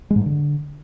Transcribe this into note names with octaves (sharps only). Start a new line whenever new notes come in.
G#3
G#2
G2
D3